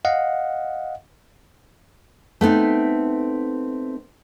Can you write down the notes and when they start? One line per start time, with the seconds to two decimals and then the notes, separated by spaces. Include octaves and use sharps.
0.05 D#5 F5 F#5
2.41 A3 B3 C4 D#4